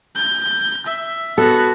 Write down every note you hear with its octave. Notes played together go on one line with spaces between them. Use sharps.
G6
E5
B3 F#4 A4